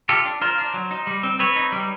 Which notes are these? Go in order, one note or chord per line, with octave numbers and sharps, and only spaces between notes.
F4 G4 A4
D4
F4 A#4 C5
D4
F#3
D#4
G3
C4
C4 B4 C#5
D#4
G3